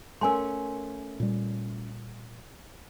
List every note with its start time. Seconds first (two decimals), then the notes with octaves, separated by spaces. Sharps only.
0.21 A3 C#4 A#4 G#5 C6
1.20 A#2 G3